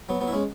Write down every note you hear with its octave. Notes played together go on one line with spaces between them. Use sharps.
F#3 B3
F#3 B3
E4
G#3 C#4